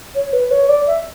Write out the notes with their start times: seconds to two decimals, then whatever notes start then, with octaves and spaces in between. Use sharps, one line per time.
0.15 C#5
0.33 B4
0.51 C#5
0.69 D5
0.87 E5